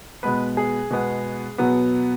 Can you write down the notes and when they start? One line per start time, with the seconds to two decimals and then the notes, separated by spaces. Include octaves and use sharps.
0.23 B2 G#3 B3 B4
0.57 G#4
0.90 B2 G#3 B3
1.58 B2 F#3 B3